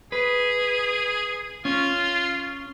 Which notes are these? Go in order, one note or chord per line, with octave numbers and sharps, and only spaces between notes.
G#4 B4
C#4 F4